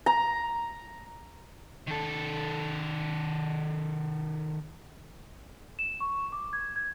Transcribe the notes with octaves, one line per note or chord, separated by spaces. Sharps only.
A#5
D#3 A4
E7
C#6
D6
G#6
G#6